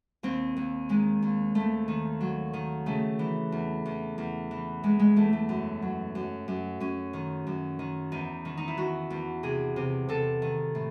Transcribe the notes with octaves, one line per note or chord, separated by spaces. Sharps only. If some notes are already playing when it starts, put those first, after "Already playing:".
D#2 C4
D#2
D#3 G#3
D#2
D#2 A3
D#3
F#3
D#3
C#3 A3
E3
E2
E2
E2
E3
E2 G#3
G#3
E2 A3
A3
F#2
F#3
F#2
F#2
F#2 C#4
D#3
F#2
D#3
E2 D#4
D#3
D#4
E4
E2 F#4
E2
C3 G#4
C3
C3 A4
D#3
A2